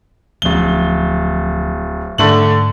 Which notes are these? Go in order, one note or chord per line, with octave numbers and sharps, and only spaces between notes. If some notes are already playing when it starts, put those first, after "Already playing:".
D1 D2 F3 C#4 G7
G#2 D3 A3 F#7